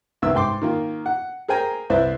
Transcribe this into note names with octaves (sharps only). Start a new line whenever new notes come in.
C2 D#3 B3 E5 E6
G#2 G5 C6 D6
D#3 A#3 F4
F#5
G#4 A#4 C5 G5 G#5 A#5
C2 E4 B4 C5 D5 E5